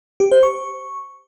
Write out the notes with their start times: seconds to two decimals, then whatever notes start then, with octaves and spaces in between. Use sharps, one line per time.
0.20 G4
0.32 C5
0.43 C#6